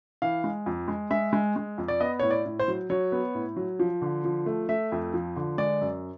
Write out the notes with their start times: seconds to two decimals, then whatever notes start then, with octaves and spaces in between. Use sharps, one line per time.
0.22 E3 F5
0.44 G#3
0.66 F2
0.88 G#3
1.11 G#3 E5
1.33 G#3
1.56 G#3
1.78 F2
1.88 D5
2.00 B3 D#5
2.19 A2 C#5
2.31 D5
2.46 A2
2.59 C5
2.68 F#3
2.90 F#3 C#5
3.12 B3
3.35 A2
3.56 F#3
3.79 F3
4.02 D3
4.24 F3
4.46 A3
4.69 A3 E5
4.92 F2
5.14 F3
5.36 D3
5.58 G#3 D5
5.81 F#2